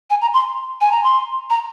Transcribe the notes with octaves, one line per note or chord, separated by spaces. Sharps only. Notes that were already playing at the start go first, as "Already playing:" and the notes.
G#5
A#5
C6
G#5
A#5
C6
A#5